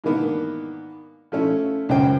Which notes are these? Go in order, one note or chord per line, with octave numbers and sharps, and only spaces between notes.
G#2 D#3 E3 A#3 B3 D4
F3 A3 C#4 E4
C#2 F#2 C#4 C5 G5